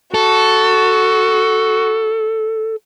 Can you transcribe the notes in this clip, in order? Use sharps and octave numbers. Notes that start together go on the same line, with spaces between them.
F#4 A4